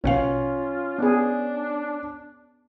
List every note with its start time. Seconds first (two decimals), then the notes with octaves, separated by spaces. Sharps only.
0.04 A#1 B2 C#4 F4 F5
0.98 B3 D4 G#4